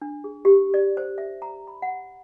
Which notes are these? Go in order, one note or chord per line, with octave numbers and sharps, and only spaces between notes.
D4
G#4
G4
D5
C5
E5
A#5
B5
F#5